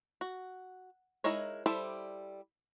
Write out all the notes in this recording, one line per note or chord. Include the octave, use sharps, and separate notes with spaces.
F#4
G#3 D#4 E4 A#4 C#5
G3 E4 A4 C5 D5